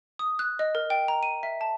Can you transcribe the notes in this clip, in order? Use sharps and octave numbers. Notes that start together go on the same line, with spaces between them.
D#6
F#6
D#5
A#4
G5
A#5
D#7
E5
A5